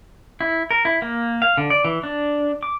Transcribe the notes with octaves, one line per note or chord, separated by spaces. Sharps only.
E4
A#4
E4
A#3
F5
D3
D5
E3
D4
D6